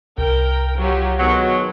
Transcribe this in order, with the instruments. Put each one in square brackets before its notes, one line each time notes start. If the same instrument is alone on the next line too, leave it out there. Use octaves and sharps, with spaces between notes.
[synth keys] C2 [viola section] A#4 G5
[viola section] F#3 F4 G4
[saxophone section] B2 F#3 [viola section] D#3 G#3